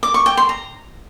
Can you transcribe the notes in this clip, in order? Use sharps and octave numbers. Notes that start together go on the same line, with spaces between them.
D6
C#6
G5
C6
A#5